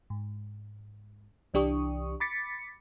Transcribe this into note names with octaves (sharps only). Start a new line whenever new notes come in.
G#2
C2 E3 D4 G4 C#6 D#6
B5 D6 A6 B6 C#7